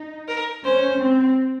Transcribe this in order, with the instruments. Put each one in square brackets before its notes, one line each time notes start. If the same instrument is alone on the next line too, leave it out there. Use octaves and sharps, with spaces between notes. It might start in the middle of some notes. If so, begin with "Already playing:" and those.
Already playing: [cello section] D#4
[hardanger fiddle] A#4
[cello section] C#4 [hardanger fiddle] C5
[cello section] C4